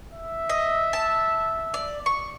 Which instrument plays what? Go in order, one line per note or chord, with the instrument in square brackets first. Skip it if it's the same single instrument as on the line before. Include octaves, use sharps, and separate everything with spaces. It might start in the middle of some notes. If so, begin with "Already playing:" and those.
[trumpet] E5
[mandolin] D#5
A5
D5
C#6